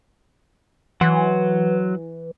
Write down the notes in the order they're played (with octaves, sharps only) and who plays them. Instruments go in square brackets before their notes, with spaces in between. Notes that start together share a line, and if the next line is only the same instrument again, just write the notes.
[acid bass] E3 [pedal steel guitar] F#3 F#5 C6